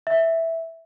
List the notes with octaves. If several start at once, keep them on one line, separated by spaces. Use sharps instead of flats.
E5